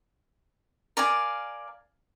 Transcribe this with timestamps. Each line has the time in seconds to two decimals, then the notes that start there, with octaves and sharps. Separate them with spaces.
0.97 A#4 D5 F5 G#5